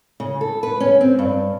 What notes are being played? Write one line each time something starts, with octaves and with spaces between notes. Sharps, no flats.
C#3
A4
B4
C#4
C4
G2